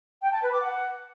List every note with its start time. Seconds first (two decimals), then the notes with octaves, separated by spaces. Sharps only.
0.22 G5
0.31 A5
0.41 B4
0.51 D6
0.61 F#5